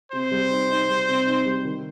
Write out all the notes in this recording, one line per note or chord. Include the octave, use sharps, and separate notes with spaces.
C3 C5
G3
D#4
D#4
G3
C3
D#4
G3
D#3